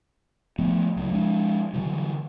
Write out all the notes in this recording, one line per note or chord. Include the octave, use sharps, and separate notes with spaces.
F3 A3 B3
C#2 F#3
F3 G#3 D4
D3 E3 F#3 G3